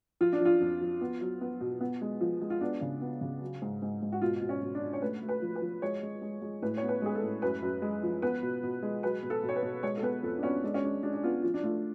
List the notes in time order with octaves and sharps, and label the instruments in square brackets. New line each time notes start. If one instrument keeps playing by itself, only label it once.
[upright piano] F3 F4
D4
F3 F4
F2
F3
B3
F#3
B3
B2
B3
G#3
F3
G#3
F4
B3 D4
C#3
B3
C#3
F#3
G#2
G#2
G#2
F#4
B2 F4
B2
C#4
B2
D4
B2
C#5
A3 B4
A3
B4
F3
B4
F3
G#3 C#5
G#3
G#3
G#3
A2 B4
C#5
B3
B4
G#3 G#4
A4
A2
F#2 B4
F#2
G#3
F3
B3 B4
B2
B2
G#3
F#3 B4
B2
A4
B2
C#5
B4
B2
G#3 C#5
A4
B3 B4
F2 A4
D4
B3 C#4
G#3 D4
C#4
G#3 D4
G#3 D4
D4
B3 F4
F3 F4
D4
A3 F4